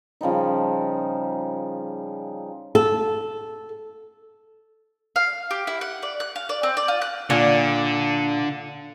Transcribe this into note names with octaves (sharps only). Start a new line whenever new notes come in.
C#3 F3 G3 D#4
A4
F5
G4
E4
F#5
D5
F#6
F5
D5
C4
D5
F4
F#6
A#2 D3